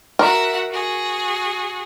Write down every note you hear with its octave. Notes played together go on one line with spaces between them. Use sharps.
F#4 A#4 E5 F#5
F#4 G#4